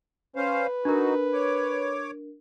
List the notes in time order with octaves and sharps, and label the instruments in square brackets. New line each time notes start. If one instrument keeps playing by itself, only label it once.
[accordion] C#4 C5 F5 [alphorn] B4
[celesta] D4 A#4 [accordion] D#4 F#4
[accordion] C#5 D6